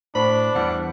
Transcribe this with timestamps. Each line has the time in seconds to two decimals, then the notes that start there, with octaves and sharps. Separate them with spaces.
0.15 A2 D4 C5 B5 C#6
0.55 E2 E3 G3 F#5